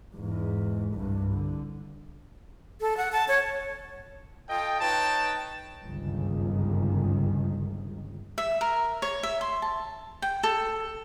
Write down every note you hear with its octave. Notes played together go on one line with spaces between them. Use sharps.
E2 G#2
C2 G2
D3
A4
F#5
A5
C#5
F4 A4 D#5 G5
D#4 B4 C#5 G5 A5
G1 C#2 F#2 D#3
E5
A#4
C#5
E5
C6
A5
G5
A4